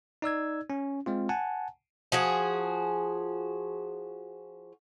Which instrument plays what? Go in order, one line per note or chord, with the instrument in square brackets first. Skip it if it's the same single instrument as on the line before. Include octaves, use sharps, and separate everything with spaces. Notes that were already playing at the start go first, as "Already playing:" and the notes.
[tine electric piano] D#4 D5 E6 G#6
C#4
G#3 C4 F4
F#5 G#5 A5
[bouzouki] F3 F#4 G#4